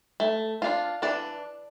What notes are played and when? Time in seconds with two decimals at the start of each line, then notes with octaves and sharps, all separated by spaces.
0.20 A3
0.62 D4 F4
1.02 E3 D4 D5